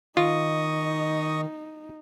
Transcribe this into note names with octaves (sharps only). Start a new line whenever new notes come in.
D#3 D#4 F4 D#5 C#6 D#6